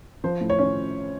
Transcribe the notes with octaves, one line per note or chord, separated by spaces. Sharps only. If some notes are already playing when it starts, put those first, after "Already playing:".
F3 C5
A2
C#5
C#4